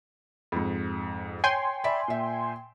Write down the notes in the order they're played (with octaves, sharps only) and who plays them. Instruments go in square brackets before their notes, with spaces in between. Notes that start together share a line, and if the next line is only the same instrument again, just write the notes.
[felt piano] F2 G#2
[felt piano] C#5 [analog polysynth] G5 G#5 C6
[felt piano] D5 E5 B5
A#2 E5